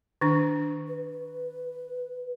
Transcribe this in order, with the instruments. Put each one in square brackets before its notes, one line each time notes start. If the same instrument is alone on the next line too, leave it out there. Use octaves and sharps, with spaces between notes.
[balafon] D#3 D4
[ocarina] B4